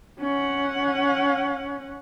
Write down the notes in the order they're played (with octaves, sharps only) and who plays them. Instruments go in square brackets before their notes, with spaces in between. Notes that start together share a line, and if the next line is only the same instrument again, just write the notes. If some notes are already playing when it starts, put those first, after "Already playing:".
[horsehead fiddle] C#4 F#5